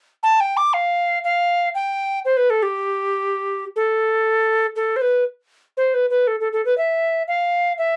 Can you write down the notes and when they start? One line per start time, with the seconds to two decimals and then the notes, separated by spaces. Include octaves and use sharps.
0.23 A5
0.40 G5
0.57 D6
0.74 F5
1.24 F5
1.75 G5
2.25 C5
2.37 B4
2.50 A4
2.63 G4
3.76 A4
4.76 A4
4.96 C5
5.01 B4
5.77 C5
5.94 B4
6.10 B4
6.27 A4
6.40 A4
6.53 A4
6.65 B4
6.78 E5
7.28 F5
7.78 E5